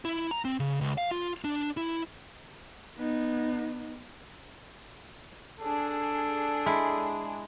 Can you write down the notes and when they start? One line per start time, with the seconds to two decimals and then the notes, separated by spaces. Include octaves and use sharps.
0.05 E4
0.31 A#5
0.45 C4
0.60 C#3
0.81 C#2
0.98 F5
1.11 F4
1.44 D4
1.77 E4
2.97 B3 D#4
5.60 D4 G#4 A4
6.66 G#3 E4